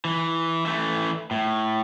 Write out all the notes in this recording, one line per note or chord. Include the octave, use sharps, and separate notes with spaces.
E3
E3 A3
A2